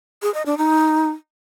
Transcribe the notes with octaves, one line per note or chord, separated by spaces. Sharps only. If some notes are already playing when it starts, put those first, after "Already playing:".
G#4
D#5
D4
D#4